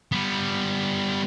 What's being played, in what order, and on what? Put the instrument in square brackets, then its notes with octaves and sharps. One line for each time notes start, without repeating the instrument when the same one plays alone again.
[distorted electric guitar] G3 B3